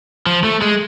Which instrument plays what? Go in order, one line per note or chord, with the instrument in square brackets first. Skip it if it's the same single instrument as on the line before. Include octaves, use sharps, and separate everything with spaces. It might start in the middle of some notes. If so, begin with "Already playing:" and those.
[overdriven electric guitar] F3
A3
G#3